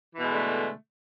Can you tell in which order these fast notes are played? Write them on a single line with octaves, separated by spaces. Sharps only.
E3 B2 G#3 D3 A3